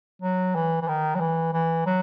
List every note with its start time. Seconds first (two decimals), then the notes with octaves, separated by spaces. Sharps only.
0.22 F#3
0.55 E3
0.82 E3
0.88 D#3
1.15 F#3
1.20 E3
1.53 E3
1.86 F#3